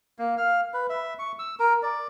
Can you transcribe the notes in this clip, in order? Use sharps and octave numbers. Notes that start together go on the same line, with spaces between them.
A#3
F5
B4
E5
C#6
E6
A#4
D5